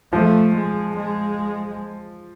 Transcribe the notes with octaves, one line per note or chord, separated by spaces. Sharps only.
F3 A3
G#3
G#3